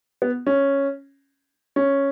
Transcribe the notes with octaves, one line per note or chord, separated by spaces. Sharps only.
B3
C#4
C#4